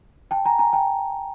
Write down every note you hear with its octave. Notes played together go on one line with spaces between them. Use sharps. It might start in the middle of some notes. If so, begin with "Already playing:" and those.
G5 A5
G#5 A#5
G#5 A#5
G5 A5